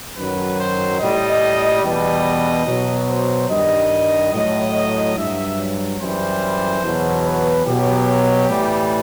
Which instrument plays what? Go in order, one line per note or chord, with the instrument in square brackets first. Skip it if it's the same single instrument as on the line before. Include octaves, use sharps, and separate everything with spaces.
[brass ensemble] F#2 D#3 F#3 B4
C5
A2 G3 D#5
E2 B2 G3 D#5
B2 F#3
C5
G2 D#3 G3 D#5
A2 F#3 D#5
G2 F#3 E5
F#2 E3 G3 C5
E2 B2 F#3
B4
B2 F#3 G4
A2 E3 G3